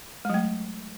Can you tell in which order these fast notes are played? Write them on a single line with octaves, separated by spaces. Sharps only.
G#3 F#3 A3